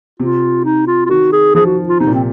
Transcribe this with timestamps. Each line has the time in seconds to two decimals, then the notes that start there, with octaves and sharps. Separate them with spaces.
0.19 C3 F4
0.65 D#4
0.87 F4
1.05 F4
1.09 D#3 F#4
1.32 G#4
1.55 F3 G#4
1.66 F#4
1.88 F4
1.99 C3 D#4
2.07 A#2
2.15 C4